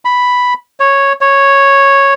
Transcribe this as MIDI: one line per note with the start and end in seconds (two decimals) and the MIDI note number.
0.05 0.54 83
0.80 1.13 73
1.21 2.14 73